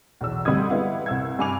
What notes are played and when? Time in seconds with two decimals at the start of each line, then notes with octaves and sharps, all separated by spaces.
0.21 B1 E2 E6
0.45 D2 G3 C4 D#4 D#6 G#6
0.69 G3 G#3 B3 E4 F5 F#5
1.06 C2 E6 G#6
1.39 G2 C3 G#5 D6 F7